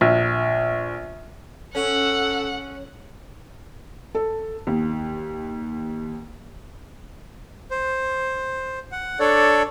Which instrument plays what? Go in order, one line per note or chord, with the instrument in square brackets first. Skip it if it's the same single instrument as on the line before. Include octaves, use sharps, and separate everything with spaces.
[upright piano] A#1
[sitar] C#4 [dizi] A4 [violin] F#5
[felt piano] A4
D#2
[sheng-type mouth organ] C5
F#5
D4 A4 C#5 D5